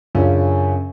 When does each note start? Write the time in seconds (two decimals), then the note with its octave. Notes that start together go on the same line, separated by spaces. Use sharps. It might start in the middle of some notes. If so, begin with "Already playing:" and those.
0.15 F#2 C#3 C#4 D4 F4